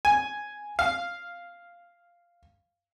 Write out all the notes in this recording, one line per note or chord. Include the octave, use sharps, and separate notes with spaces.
G#5
F5